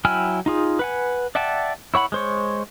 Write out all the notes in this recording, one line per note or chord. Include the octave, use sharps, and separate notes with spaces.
F#3 E4 G5 G#5 F6
D#4 F4 G#4
B4 F#5 G#5
D5 E5 F#5 G5 A5
E4 C#5 F#5 B5
G#3 C5 C#5